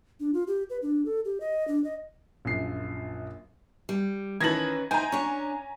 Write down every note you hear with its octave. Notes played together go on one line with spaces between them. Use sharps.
D4
F4
G4
B4
D4
A4
G4
D#5
D4
D#5
A#1 F#2 F4 C7
G3
D#3 E3 C#4 B4 A5 G#6 A#6 F#7
D#4 E4 C5 G5 G#5 A#5
C#4 D4 C#5